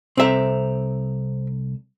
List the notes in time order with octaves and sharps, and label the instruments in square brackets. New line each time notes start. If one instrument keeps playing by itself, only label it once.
[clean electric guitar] C2 A4 A#5 [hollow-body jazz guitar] C4 E5